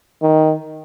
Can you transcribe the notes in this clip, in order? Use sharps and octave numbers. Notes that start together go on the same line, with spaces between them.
D#3